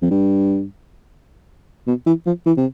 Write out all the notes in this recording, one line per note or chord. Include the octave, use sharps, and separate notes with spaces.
F2
G2
B2
E3
F3
E3
C3